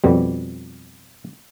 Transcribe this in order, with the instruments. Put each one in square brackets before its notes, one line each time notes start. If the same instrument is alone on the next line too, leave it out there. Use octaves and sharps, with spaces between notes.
[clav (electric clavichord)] F2 B2 G3